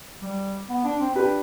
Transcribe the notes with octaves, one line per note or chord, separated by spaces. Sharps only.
G3
B3
D4
C4
D4 G4 B4